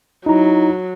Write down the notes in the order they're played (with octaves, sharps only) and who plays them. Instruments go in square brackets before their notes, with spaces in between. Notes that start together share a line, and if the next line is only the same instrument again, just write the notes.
[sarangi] F#3 [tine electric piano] D#4 E4 A#5